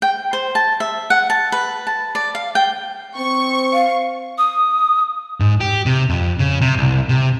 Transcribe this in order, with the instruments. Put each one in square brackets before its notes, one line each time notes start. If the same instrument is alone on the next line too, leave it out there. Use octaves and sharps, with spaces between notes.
[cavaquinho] G5
C5
A5
E5
F#5
A5
B4
A5
D5
F5
G5
[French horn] C4 [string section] C#6
[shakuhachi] F5
[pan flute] D#6
[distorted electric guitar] G#2
G4
C3
F2
C#3
C3
C2
C3